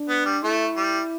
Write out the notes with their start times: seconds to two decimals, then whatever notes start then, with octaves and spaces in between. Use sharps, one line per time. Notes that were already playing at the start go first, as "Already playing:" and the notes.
Already playing: D4
0.09 B3
0.26 G3
0.43 A3 E4
0.76 G3